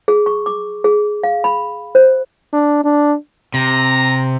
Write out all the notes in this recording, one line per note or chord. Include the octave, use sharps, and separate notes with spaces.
G#4
C#6
D6
G#4
F5
B5
C5
D4
D4
C3 A#5